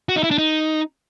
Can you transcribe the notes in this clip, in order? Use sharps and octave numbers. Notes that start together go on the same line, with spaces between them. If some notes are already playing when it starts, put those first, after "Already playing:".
F#4
D#4
E4
D4
D#4